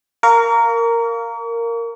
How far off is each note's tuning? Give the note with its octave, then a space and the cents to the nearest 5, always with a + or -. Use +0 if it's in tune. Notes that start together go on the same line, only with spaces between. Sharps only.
A#4 -10 F5 +0 C#6 +45